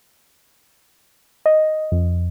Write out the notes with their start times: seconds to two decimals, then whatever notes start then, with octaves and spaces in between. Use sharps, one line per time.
1.46 D#5
1.92 F2